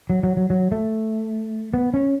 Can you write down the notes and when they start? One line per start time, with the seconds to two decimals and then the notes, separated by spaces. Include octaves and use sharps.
0.10 F#3
0.23 F#3
0.37 F#3
0.50 F#3
0.72 A3
1.74 B3
1.94 C#4